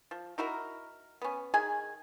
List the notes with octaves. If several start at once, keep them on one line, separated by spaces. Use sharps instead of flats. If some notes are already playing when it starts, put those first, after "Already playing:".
F3
D#4 E4 F#4 A#4
B3 C#4
D#3 G#4 G#5